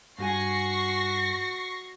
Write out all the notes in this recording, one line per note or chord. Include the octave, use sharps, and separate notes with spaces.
G2 F#4 G4 G#5 C#6 A#6 C7